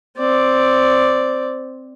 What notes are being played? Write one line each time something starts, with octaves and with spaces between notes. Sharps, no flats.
C4 D5